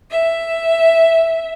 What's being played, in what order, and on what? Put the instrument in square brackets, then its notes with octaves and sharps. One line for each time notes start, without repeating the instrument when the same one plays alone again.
[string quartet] E5